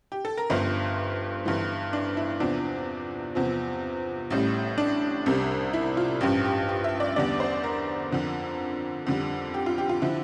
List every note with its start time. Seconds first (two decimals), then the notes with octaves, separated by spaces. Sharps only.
0.12 G4
0.25 A4
0.37 A#4
0.50 G1 G2 F3 C5
1.45 G1 G2 E3 G3
1.93 D4
2.17 E4
2.40 E2 C3 F3 D4
3.35 E2 C3 F3
4.31 A1 A2 G3
4.78 D4
5.26 C2 C3 G3
5.73 E4
5.97 F4
6.21 A1 G2 F3 G4
6.45 G4
6.69 G4
6.84 E5
7.00 D5
7.16 E2 D3 G3 D5
7.40 C5
7.63 A#4
8.11 F2 D3 F3
9.07 F2 D3 G3
9.54 G4
9.66 F4
9.78 G4
9.89 F4
10.02 D3 F3 E4